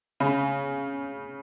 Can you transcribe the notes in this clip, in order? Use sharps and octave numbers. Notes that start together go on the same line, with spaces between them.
C#3